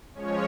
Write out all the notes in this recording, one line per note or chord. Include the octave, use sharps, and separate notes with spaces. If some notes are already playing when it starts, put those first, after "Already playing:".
F3 G#3 C#4 C#5